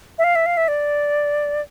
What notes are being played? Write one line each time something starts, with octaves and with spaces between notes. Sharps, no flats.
E5
F5
E5
F5
E5
D5